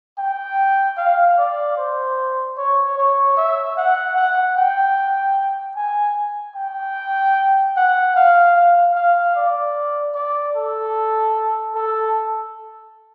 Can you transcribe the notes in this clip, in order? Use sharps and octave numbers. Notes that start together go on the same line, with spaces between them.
G5
F5
D5
C5
C#5
C#5
E5
F#5
F#5
G5
G#5
G5
F#5
F5
F5
F5
D5
D5
A4
A4